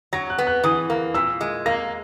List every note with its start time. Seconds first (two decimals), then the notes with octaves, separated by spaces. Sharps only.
0.13 F#3 A#6
0.30 F#6
0.38 B3
0.47 F#6
0.64 E3 D#6
0.90 A#3
1.14 A#2 E6
1.41 G#3
1.66 A#3 A#6